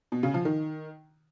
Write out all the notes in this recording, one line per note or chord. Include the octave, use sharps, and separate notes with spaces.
B2
C#3
F3
D#3